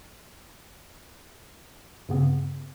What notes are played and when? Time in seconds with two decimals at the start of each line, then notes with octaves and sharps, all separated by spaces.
2.09 G2 C#3 B3 C4